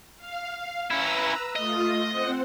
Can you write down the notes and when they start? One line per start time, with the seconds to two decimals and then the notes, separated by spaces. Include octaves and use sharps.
0.17 F5
0.90 C#4 E4 B4 A#5 E6
1.56 A3 F4 D#5
2.09 C4 C5 F#5